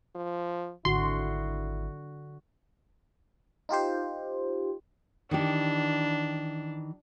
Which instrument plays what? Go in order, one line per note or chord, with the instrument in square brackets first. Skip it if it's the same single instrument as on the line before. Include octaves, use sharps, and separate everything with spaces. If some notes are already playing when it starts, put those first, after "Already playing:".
[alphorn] F3
[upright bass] G#1 [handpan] D3 F#4 [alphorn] E4 [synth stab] C6
[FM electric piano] D#4 F4 G4 C5
[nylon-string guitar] D#3 E3 G4 [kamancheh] D4